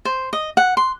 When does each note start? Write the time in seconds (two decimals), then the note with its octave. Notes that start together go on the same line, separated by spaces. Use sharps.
0.05 C5
0.33 D#5
0.57 F#5
0.77 C6